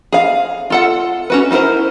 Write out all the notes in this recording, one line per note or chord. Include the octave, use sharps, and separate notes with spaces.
G#4 F5
F4 A4 F#5
C#4 F#4 B4
D#4 E4 G#4 A#4 C5